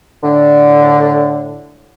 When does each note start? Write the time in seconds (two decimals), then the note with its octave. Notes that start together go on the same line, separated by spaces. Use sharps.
0.23 A2 D3